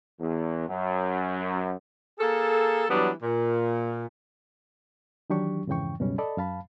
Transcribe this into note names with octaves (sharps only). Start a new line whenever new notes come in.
E2
F#2
A#3 G#4 A4
E3 F#3 G3 B3 D4
A#2
D#3 E3 F#3 D4 G4 C#6
F2 G#2 C#3 E3 G5 C#6
C#2 F#2 B2 G3 C#4
A4 D5 D#5 A5 B5
F#2 F5 A5 B5